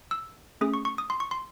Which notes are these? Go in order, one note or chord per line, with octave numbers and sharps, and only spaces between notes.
E6
A3 C#4 G#4 D#6
C#6
C#6
D#6
C6
C#6
C6